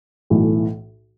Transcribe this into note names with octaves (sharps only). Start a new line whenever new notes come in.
B1 A2 E3 A3